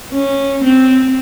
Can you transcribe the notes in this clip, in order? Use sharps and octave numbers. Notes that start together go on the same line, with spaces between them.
C#4
C4